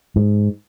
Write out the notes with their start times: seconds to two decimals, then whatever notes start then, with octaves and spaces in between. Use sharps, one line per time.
0.16 G#2